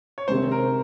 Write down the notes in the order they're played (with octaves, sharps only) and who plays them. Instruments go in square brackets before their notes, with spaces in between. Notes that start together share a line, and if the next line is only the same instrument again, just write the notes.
[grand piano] C#5
[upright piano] C3 D#3 G#3 [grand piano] C5
[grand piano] A#4